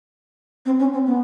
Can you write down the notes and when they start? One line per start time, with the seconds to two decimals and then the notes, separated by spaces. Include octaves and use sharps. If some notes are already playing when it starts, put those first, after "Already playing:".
0.65 C4
0.79 C#4
0.93 C4
1.06 B3